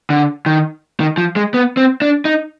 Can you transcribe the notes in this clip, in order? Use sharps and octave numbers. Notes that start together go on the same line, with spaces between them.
D3
D#3
D#3
F3
G#3
B3
C4
D4
D#4